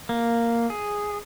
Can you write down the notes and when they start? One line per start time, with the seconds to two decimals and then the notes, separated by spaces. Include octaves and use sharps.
0.09 A#3
0.70 G#4